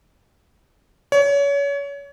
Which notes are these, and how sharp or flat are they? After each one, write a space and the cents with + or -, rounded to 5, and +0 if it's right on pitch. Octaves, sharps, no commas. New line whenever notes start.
C#5 +30